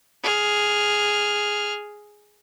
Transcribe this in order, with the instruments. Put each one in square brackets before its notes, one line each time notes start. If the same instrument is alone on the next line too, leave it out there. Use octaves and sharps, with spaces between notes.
[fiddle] G#4 F6